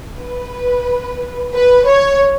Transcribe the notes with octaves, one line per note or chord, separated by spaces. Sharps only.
B4
B4
C#5